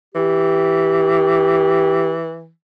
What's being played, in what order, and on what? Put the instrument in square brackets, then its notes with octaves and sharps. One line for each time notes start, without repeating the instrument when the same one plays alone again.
[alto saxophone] E3 [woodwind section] G4